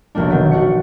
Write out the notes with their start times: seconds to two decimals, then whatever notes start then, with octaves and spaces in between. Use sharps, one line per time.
0.15 F1 B1 A#3 D4
0.30 D#3 B3
0.51 D4 F#4 C#7